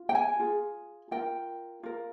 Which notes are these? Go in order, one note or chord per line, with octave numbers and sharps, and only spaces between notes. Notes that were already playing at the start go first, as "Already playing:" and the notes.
Already playing: F4
G5
G#5
F4 G#4
F4 A#4 G5
F4 A#4